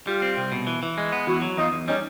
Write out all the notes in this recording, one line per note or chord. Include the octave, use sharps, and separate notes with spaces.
G3 F4 G4
C4
C2
B2
E3
E3
G#3
B3
E2 E4 F#4
F#3
E2 D#4 F4
E2
G3 C#4 D#4